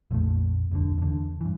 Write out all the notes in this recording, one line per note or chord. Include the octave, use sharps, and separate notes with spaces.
A#1 F2 A#2 A3
F1 C2 A#2 D3
E2 D3
G2 E3